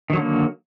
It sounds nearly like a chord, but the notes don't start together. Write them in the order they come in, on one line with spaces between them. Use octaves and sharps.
D#3 F#3 D3 A#3